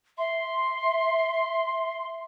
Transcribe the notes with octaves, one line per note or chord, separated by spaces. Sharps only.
E5 C6